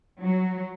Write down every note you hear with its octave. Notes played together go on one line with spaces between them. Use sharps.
F#3